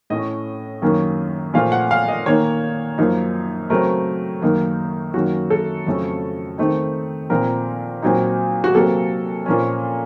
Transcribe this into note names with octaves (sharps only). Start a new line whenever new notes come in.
A2 A3 C#4 D#5
F#2 D#3 A#3 C#4
A#2 F3 A3 F5
F#5
F5
D#5
D#3 A#3 D#4 C#5
F#2 F3 A#3 D#4
C#3 F#3 A3 C4 A#4
F#2 D#3 A#3 D#4
F#2 D#3 A#3 C#4 F#4
A4
F2 C#3 F#3 A3 C#4
D#3 A3 C4 D#4
A#2 F3 C4 A#4
A#2 F#3 C4 D#4
F#4
C3 F#3 A#3 A4
A#2 F3 A#3 C#4